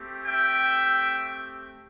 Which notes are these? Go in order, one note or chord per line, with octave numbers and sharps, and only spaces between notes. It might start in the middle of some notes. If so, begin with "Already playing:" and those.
Already playing: A3 C4 G4
E5 G5